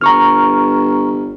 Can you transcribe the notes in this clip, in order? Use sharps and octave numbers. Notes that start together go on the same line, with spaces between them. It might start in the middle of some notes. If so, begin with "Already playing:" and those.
G1 A#5 C#6 F6